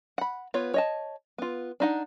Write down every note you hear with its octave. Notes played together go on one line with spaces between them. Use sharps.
F#5 B5
B3 F4 C#5
C#5 D#5 A5
B3 F4
D4 D#4 F#5